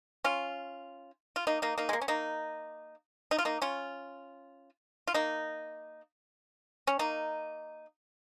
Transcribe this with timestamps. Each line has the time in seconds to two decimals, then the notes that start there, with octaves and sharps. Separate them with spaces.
0.24 C#4 F4
1.36 F4
1.47 A#3 D#4
1.62 A#3 D#4
1.78 A#3 D#4
1.89 G#3
1.93 A#3
2.02 C#4
2.08 A#3 D#4
3.31 D#4
3.38 F4
3.45 A#3 D#4
3.62 C#4 F4
5.07 F4
5.14 A#3 D#4
6.87 C#4
6.99 A#3 D#4